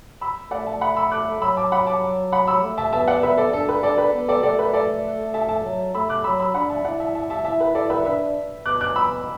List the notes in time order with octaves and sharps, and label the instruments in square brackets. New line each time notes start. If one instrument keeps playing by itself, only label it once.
[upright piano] B5 E6
[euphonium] A3 [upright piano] D5 F#5
[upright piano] E5 A5
F#5 B5
B5 E6
D6 F#6
[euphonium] F#3 [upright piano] B5 E6
[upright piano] A5 D6
F#5 B5
A5 D6
F#5 B5
B5 E6
[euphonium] A3
[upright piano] E5 A5
[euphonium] B3 [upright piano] E5 A5
[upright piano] D5 F#5
B4 E5
A4 D5
[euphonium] D4 [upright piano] A4
[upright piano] B4
[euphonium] D4 [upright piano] A4 D5
[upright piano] B4
[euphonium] B3
[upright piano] A4 D5
[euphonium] A3 [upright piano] A4 D5
[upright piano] B4
A4 D5
E5 A5
E5 A5
[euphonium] F#3
[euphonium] A3 [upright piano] B5 E6
[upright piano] D6 F#6
[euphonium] F#3 [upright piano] B5 E6
[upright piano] B5 E6
[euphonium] D4 [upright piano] F#5 B5
[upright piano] E5 A5
[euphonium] E4 [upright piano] D5 F#5
[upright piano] E5 A5
E5 A5
E5 A5
[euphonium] E4 [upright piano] E5 A5
[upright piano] B4
[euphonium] E4 [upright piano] A4 D5
[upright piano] B4 E5
[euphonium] D4 [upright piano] B4 E5
[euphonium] B2 [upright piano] D6 F#6
[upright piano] D6 F#6
[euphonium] B2 [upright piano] B5 E6